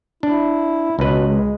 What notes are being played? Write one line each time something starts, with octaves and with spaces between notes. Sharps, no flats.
D4 E4
C#2 B2 B4
G#3